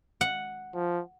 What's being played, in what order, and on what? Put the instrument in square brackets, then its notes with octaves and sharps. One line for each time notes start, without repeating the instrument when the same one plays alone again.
[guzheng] F#5
[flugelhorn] F3